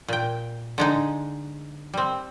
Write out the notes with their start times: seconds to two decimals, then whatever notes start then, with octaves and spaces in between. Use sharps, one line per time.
0.08 A#2 G5
0.78 D3 G#3 D#4
1.94 G3 C4